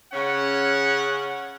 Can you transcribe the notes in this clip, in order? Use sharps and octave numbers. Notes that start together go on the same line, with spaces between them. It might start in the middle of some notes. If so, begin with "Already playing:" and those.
C#3 C#4 F#5